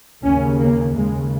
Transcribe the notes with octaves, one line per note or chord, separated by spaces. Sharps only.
D#2 C#3 C#4
A#3
D#2 C#3 G#3